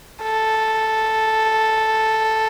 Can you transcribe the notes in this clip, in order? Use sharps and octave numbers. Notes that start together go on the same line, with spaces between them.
A4